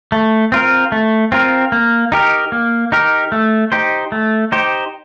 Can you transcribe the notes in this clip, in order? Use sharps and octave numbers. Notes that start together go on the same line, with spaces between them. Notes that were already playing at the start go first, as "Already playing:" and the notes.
A3
C4 F4 A#4
A3
C4 F4 A#4
A#3
D#4 G4 A#4
A#3
D#4 G4 A#4
A3
D#4 G4 C5
A3
D#4 G4 C5